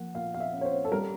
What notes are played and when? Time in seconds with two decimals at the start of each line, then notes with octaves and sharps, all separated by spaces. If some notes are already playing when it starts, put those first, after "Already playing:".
Already playing: F3 A#3 F#5
0.14 A#2 F5
0.34 F5
0.40 E5
0.53 C#4
0.61 C#5
0.65 C5
0.85 A4
0.92 G3 A#4